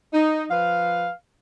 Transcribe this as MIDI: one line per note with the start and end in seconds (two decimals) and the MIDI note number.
0.13 0.45 63
0.51 1.10 53
0.51 1.10 71
0.51 1.10 77